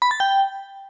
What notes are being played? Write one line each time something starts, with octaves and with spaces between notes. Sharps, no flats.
B5
A6
G5